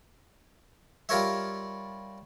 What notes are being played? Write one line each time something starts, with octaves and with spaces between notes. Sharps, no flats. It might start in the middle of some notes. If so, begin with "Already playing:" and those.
G3 F4 A#4 C#5 E5